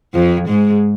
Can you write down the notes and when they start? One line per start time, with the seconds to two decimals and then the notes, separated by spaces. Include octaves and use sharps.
0.14 F2 F3
0.48 G#2 G#3